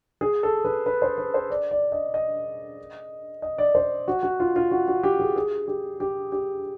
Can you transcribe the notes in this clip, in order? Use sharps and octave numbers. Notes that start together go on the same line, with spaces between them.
G#4
A4
B4
B4
C5
B4
C5
D5
D5
D#5
D#5
D#5
D5
C5
F#4
F#4
F4
F4
F#4
F#4
G4
G#4
G#4
G4
G4
G4